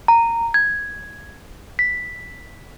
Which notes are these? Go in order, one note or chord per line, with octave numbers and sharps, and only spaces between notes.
A#5
G#6
B6